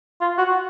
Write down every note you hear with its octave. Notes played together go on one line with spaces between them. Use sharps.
F4
F#4